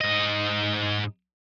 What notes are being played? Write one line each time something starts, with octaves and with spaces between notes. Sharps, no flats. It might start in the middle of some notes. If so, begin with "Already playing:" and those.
G#2 D#5